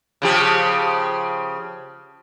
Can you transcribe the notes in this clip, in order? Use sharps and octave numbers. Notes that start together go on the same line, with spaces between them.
C#3 F3 G4